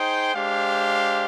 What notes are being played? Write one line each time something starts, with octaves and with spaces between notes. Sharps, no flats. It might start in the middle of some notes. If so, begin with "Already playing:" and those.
Already playing: D#4 G#4 C5 G5
G#3 D4 G4 C5 F5